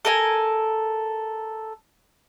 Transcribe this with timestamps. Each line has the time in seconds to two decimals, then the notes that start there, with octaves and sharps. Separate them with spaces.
0.05 A4 A#4 G#5